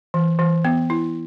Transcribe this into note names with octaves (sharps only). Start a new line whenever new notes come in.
E3
E3
B3
E4